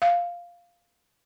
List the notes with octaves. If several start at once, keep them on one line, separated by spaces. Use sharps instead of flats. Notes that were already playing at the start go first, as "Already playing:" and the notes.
F5